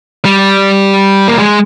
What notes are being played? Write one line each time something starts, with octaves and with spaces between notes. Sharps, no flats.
G3
A#3
G#3